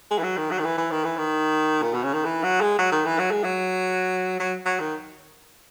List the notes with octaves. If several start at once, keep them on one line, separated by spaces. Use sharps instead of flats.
G#3
E3
F#3
D#3
F#3
D#3
E3
E3
D#3
E3
D#3
A#2
B2
C#3
D#3
E3
F#3
G#3
F#3
D#3
E3
F#3
G#3
F#3
F#3
F#3
D#3